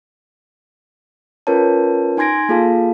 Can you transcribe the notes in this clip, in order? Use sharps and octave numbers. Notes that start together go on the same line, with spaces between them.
C#4 F4 A#4 B4 C#5 A5
D#4 G#5 C6 G#6 A#6 D7
A#3 F4 G#4 A4 F5 A5